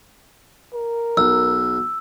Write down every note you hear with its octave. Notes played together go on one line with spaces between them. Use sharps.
A#4
B1 E6